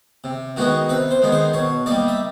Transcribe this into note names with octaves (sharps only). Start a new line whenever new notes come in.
C3
D#3 G#3 B3 D#4 F#4
C3 B4
C5
D#3 G#3 B3 D#4
C5
B2 C#5
G3 A#3 D#4 D5
E5